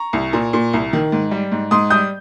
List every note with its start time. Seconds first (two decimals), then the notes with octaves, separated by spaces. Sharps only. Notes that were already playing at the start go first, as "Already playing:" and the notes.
Already playing: A#5 C#6
0.13 C2
0.33 A#2
0.53 A#2
0.73 C2
0.93 D#3
1.12 G#2
1.31 G3
1.52 G#2
1.71 G#2 C6 D#6
1.90 G3 D#6 G6